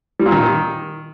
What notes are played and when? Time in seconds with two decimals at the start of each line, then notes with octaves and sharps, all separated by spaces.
0.19 G3
0.26 A#2
0.32 D#3